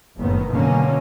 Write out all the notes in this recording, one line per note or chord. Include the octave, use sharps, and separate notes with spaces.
F#1 A2 D#3 B3
B2 D3 F#3 A#3 C#4